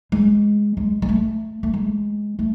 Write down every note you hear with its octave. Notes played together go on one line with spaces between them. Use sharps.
G#3
G#3
G#3
A3
A3
G#3
A3